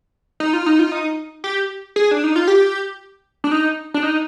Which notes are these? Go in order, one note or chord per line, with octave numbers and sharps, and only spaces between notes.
D#4
F4
D#4
F4
D#4
G4
G#4
D4
D#4
F4
G4
D4
D#4
D4
D#4